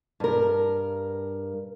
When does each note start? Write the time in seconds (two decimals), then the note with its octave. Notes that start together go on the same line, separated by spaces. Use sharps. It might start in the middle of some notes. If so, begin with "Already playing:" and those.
0.20 G2 A#4